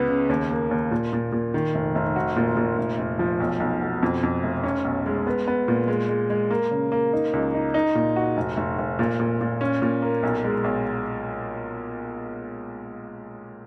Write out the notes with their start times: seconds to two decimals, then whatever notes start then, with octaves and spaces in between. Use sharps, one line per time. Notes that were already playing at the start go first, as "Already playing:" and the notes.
Already playing: C#2 B3
0.09 C#3
0.29 D#2
0.50 A#3
0.71 D#2
0.91 A#2
1.13 A#2
1.32 A#2
1.54 D#3
1.75 F1
1.95 F1
2.16 F#4
2.36 A#2
2.57 A#2
2.78 F1
2.99 F1
3.19 F3
3.40 B1
3.60 B1
3.81 B2
4.03 F2
4.23 F2
4.43 F1
4.64 C#4
4.85 B1
5.06 G#3
5.27 B3
5.48 B3
5.68 A#2
5.88 G#3
6.09 G#3
6.30 G#3
6.51 A#3
6.71 C#3
6.92 A#3
7.13 D#4
7.33 C#2
7.54 D#4
7.74 D#4
7.95 A#2
8.16 F#4
8.37 F1
8.57 F1
8.78 F1
8.99 A#2
9.20 A#2
9.41 A#2
9.61 C#4
9.82 A#2
10.02 A#3
10.23 B1
10.44 G#3
10.64 B1